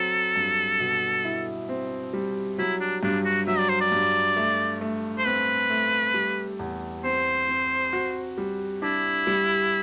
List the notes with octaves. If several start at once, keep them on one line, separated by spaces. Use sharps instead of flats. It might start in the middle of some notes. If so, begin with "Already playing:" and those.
Already playing: F#3 C4 A4
G2
B2
E4
C4
G3
F#3 E4
D4
G2 D4
F#4
F#3 E5
D5
C5
D5
G2
A3
A3
C5
C4 B4
A3
G3
E2
C4 C5
C4
F#4
G3
D4 E4
G3